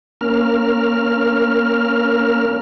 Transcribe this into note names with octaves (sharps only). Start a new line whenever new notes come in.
A#3 C#4 A#4 F6